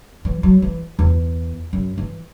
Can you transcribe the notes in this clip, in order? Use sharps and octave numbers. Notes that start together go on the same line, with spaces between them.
E3
F#3
E3
E2
F#2
E3